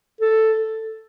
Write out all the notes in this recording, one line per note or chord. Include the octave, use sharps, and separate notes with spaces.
A4